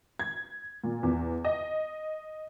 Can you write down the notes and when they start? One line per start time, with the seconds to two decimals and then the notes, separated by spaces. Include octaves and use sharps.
0.19 G#6
0.84 A#2
1.03 E2
1.45 D#5